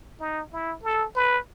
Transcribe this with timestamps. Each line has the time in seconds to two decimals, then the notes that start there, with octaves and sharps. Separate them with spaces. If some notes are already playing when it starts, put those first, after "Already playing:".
0.20 D#4
0.53 E4
0.84 A4
1.15 B4